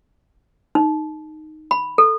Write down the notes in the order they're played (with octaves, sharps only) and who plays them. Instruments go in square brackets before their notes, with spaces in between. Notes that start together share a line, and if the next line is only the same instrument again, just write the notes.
[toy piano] D#4
B5
A4